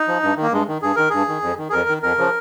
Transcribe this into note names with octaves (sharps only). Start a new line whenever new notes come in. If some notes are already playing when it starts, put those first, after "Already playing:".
Already playing: D#4
F3
G2
D#3
A#3
G2 G#3
D#3
G2 G#4
D#3 A#4
G2 G#4
D#3
F2
D#3
G#4
F2 A#4
D#3
F2 A#4
C#3 F3